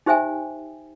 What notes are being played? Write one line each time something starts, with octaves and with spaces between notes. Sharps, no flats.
D#4 G4 C5 E5 G5 G#5